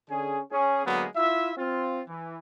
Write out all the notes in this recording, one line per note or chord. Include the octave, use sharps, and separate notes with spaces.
D3 C#4 G#4
C#4 G#4
D3 F#3 G#3 A#3 B3
E4 F4 E5
C4 F4
E3